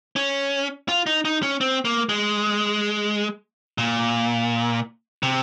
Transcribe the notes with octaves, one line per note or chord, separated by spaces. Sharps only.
C#4
F4
D#4
D#4
C#4
C4
A#3
G#3
A#2
C3